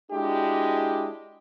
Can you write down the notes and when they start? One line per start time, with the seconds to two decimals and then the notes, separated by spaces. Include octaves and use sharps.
0.11 G#3 D4 E4 F#4 G4